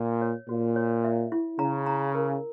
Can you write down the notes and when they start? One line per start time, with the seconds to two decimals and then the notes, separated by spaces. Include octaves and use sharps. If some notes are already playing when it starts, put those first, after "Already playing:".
Already playing: A#2
0.22 C#5
0.48 A#2 F#4
0.76 C#5
1.04 E5
1.32 E4
1.59 C#3 A#5
1.86 A#5
2.15 A#4